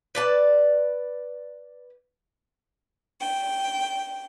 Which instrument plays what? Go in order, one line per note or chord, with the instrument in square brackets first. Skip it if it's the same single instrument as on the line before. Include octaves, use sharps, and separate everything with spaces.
[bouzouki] B4 D5 A5
[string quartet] G5